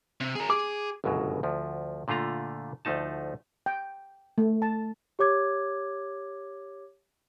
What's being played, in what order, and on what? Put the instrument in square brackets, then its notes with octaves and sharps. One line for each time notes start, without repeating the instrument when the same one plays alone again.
[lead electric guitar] C3
G#4 A#4
[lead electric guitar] G#4 [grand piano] D6
[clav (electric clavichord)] G1 C#2 F#2 B2 F#3
D2 F3
A#2 D3 A3 F4 A#5
D2 F3 A3 D#4 A5
[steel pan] G5
A3
A5
[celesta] G4 C#5 D6 G#6